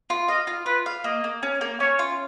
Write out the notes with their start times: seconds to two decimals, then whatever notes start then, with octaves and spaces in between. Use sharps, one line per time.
0.10 F4
0.28 D#5 F5
0.47 F4
0.66 F4 B4
0.86 F5
1.04 A#3 D#5
1.24 A#3
1.43 C#4
1.61 A#3
1.80 C#4 C#5
1.99 F4